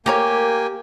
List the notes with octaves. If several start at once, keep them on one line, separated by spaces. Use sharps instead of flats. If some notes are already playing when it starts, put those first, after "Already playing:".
A#3 G4 A#4 C#5 G5 G#5